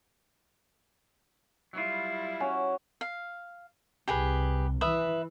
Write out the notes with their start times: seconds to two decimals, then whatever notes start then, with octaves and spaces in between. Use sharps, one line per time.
1.73 F#3 G3 E4 F4
2.40 C#4 F#4
3.01 F5
4.08 C2 G4 G#4 B4
4.81 E3 B4 E5 D#6